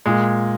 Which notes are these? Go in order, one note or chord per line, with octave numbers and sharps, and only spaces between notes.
A#2 G#3